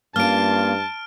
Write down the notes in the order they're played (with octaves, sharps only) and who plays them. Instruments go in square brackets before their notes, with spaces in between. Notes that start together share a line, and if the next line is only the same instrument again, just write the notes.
[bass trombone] G2 [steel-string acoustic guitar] A#3 C#4 F4 [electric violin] A5 [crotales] F6 D7